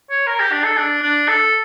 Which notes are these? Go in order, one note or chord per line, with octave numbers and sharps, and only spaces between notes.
C#5
A#4
G4
D4
A4
D4
D4
A4